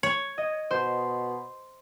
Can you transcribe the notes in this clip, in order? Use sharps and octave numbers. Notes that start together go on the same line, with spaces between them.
C#5
D#5
B2 C5